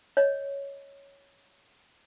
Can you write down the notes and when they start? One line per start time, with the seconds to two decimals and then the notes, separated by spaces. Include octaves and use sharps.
0.17 C#5 D#5